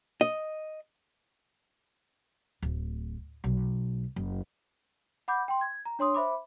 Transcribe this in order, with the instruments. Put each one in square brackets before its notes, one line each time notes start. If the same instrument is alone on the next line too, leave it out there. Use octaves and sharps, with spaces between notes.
[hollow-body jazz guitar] D#5
[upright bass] D1
B1
F#1
[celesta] F#5 B5 D6 G6
G5 C6
G#6
A#5
D4 C#5 C6 D#6
C5 E5 B5 D6